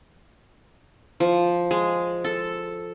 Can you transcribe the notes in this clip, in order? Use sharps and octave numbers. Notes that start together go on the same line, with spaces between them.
F3
G#3
A4